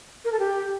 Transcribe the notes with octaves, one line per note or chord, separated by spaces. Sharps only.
A#4
A4
G4